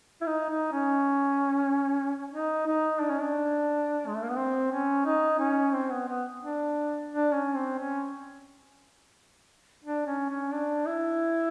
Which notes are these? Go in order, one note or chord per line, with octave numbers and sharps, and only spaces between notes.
E4
D#4
D#4
C#4
D#4
D#4
D4
C#4
D4
G#3
A3
A#3
B3
C4
C#4
D#4
C#4
C4
B3
B3
D4
D4
C#4
C4
C#4
D4
C#4
C#4
D4
E4